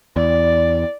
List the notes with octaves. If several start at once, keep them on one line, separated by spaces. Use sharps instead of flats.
E2 D5